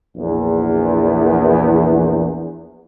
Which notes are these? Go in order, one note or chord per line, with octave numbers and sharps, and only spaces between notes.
A#1 E2